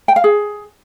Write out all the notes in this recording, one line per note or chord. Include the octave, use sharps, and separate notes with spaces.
G5
F5
G#4